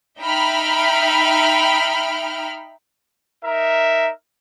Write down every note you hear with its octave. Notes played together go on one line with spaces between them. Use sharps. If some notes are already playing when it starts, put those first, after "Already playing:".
D#4 E5 G5 B5 F6
D#4 A#4 E5